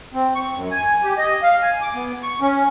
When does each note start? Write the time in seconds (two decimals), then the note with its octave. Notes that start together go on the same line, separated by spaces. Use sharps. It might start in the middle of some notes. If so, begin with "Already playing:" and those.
0.14 C4
0.35 C#6
0.54 F#2
0.71 G#5
1.04 G4
1.18 D#5
1.43 F5
1.62 G#5
1.82 D6
1.94 B3
2.23 C#6
2.41 C#4